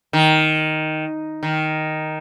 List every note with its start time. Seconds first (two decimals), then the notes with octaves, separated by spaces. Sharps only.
0.13 D#3
1.43 D#3